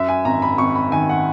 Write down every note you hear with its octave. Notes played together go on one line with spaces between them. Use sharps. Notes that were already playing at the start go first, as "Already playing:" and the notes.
Already playing: F#2 E5
G#5
G#1 A#5
B5
G#1 C#6
B5
D#3 G#5
F#5